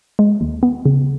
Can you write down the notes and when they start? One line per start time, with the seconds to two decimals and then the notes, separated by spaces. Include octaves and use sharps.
0.19 G#3
0.41 D#2
0.63 B3
0.85 C#3